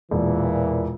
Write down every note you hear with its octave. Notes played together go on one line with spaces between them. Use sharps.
E1 A#2 E3